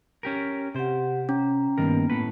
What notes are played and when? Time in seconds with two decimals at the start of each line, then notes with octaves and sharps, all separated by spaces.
0.23 C#4 G4 A#4
0.75 C3 G4 C5 F#5
1.29 C#4 A#5
1.78 G2 D#3 A#3 B3 A#4
2.10 A2 B4